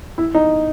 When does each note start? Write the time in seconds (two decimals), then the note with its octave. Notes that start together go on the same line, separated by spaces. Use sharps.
0.18 E4
0.35 D#4